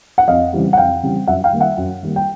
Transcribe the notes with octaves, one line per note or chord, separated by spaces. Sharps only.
F#5
F2 D#5 F5
C#3 E3 G3 C4
F#5
F2 F5 G5
C#3 E3 G3 C4
F#2 E5 F#5
F5 G5
D#3 G3 A#3
E5 F#5
F#2
D#3 G3 A#3
G5